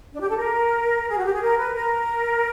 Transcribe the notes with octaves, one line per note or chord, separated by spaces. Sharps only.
D4
G4
A4
A#4
G#4
F#4
G4
G#4
A#4
B4
A#4